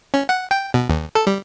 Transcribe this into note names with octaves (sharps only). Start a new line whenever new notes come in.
C#4
F#5
G5
B2
D#2
A4
G3